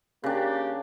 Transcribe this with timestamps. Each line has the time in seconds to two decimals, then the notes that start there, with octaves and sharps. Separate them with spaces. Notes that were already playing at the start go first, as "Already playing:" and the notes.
0.24 C#3 A#3 D4 G4